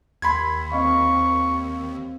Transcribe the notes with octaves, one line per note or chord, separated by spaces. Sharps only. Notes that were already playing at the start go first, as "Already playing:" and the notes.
D#2 B5 C6 G#6
C4 D#5 F5 C#6